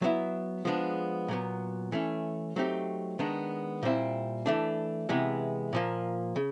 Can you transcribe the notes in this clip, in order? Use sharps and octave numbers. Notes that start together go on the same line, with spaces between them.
F#3 B3 E4
F3 G#3 B3 D4
A#2 F#3 B3
E3 A3 C#4
F#3 A3 C4 D#4 G4
D#3 G#3 B3 D4
A#2 G3 C4 E4
E3 A3 D4
C3 E3 G#3 B3
A#2 F3 A#3
C#3